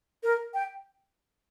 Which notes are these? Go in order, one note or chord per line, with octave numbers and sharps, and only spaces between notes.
A#4
G5